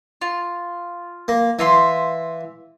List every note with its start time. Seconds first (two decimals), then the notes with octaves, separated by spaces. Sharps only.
0.21 F4
1.28 A#3
1.59 E3 E5 F5 C6